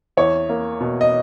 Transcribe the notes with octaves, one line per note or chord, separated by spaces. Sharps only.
E2 C#5
A#3
B2
D#5